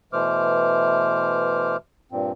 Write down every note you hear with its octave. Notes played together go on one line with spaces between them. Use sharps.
B2 E3 A3 C5 D6 F6
G2 A#2 C4